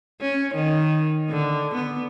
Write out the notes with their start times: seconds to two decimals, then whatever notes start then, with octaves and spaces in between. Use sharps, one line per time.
0.21 C#4
0.55 D#3
1.31 D3
1.75 B3